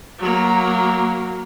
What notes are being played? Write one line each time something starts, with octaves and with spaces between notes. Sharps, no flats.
F#3 A#3